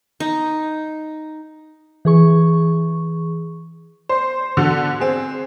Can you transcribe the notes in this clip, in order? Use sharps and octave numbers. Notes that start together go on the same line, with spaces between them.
D#4
E3 G#4 C#6
C5
D3 F#4 A4
C4 G#4